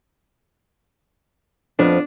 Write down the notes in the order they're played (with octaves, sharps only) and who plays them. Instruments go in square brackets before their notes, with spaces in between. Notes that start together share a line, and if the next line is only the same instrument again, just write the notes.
[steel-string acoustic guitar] F2 F3 B3 [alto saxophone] D4